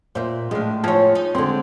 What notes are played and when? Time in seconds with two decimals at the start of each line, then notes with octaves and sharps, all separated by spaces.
0.15 A#2 C5 E5
0.51 A2 F3 G#3 D4
0.84 E3 F3 C#5
1.15 D#4
1.35 D3 G#3 C4 C6